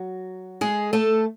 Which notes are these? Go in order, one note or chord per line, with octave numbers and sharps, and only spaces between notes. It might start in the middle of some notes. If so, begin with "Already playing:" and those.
Already playing: F#3 F#4
G#3 G#4
A3 A4